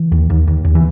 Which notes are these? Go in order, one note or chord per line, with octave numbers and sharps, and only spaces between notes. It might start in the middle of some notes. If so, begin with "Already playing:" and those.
Already playing: E3
D#2
D#2
D#2
D#2
E3